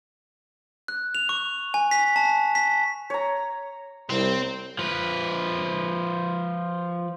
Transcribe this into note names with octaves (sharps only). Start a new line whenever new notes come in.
F#6
F7
C#6
G#5
B6
A5
B6
C#5 A#5
C2 C4
F3 B4